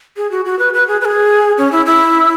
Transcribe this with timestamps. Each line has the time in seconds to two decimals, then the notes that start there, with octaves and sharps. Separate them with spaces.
0.17 G#4
0.31 F#4
0.45 F#4
0.59 B4
0.74 B4
0.88 G#4
1.01 B4
1.05 G#4
1.58 C#4
1.72 E4
1.86 E4